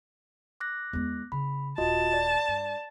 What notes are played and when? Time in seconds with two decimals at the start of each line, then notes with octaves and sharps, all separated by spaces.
0.60 D6 F#6 A#6
0.93 E2 G#3
1.32 C#3 B5
1.78 D#1 F4 F#4 D#5 A5
2.13 D5
2.48 G2